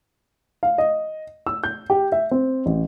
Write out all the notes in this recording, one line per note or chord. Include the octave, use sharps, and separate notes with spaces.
F5
D#5
E6
G6
G4
E5
C4
A1